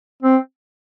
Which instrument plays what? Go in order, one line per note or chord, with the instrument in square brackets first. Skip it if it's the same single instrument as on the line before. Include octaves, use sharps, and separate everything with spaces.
[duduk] C4